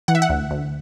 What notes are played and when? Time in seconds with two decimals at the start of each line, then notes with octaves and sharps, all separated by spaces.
0.08 E3 F#5
0.15 E5
0.22 F#5
0.29 D2
0.51 D2